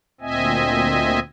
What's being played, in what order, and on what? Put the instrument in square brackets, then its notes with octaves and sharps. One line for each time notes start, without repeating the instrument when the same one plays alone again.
[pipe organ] D2 A#2 C4 D#5 E5 G#5